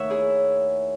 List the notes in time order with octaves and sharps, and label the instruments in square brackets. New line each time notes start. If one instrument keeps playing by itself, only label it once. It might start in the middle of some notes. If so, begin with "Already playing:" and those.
Already playing: [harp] D#2 D#3 A3 C#5 E5 F#5
E4 G#4